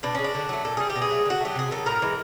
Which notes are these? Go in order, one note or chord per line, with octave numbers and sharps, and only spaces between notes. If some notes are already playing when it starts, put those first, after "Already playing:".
B2 D4
G#3 C#4
D4
D3
F#3 A3
A#2 A4
G3 G#4
G4
B2
G#4
F#3 A3
D3 F#4
F#3 A3 G4
C3 G#4
D#3 F#3 A4
A2 A#4
E3 G#3